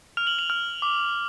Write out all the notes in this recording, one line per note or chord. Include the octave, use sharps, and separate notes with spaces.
F6 F7
F#7
F7
F6
D6